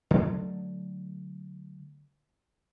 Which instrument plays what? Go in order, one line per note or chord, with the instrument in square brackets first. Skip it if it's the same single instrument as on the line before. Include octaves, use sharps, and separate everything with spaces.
[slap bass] D3 F#3 A3